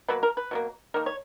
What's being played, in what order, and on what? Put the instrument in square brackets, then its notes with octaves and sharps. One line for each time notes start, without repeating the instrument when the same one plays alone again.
[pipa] B2 F#3 A#3 B4
A#4
B4
B2 F#3 A#3
D#3 A#3 A#4
C#5